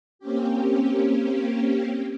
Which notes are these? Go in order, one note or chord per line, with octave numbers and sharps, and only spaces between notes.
A#3 C4 C#4 G4